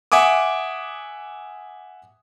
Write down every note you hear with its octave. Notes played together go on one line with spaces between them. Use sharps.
E5 F#5 G#5 D6 D#6